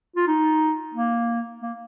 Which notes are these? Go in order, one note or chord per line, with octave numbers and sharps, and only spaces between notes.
F4
D#4
A#3
A#3